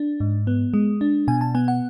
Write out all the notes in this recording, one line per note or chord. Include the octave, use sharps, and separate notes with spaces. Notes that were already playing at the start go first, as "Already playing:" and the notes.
Already playing: D4
G#2
B3
G#3
D4
B2 G#5
A5
B3 G#5
F#5